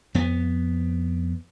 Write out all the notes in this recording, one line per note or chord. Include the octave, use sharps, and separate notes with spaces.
F2 B3